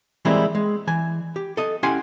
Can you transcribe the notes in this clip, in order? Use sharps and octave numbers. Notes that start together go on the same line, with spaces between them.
E3 G3 G#3 A#3 C4 E4
G#3
E3 G#5
G4
A4 D#5
C#4 E4 G4 F#5 G#5 C6